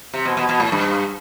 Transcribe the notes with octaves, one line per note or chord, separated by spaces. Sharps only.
C3
B2
B2
B2
A2
G2